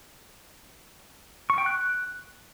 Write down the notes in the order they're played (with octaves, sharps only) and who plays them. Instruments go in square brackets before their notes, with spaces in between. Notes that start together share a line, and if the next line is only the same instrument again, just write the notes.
[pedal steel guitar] C#6
G5
F#6